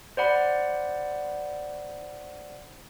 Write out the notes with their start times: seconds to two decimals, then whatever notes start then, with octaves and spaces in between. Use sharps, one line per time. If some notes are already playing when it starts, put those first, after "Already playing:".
0.17 C5 D5 F#5 B5